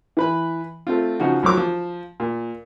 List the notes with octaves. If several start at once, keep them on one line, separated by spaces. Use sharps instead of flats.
E3 B4 B5
A3 C4 F4
C#3 F3 D#4 F#4
B1 F3 F#3 A#4 D6 E6
F3
A#2